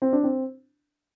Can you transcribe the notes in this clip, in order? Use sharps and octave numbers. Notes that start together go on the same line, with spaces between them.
C4
D4
C4